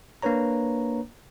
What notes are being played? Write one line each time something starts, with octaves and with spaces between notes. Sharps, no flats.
A#3 D4 B4 C#5 A#5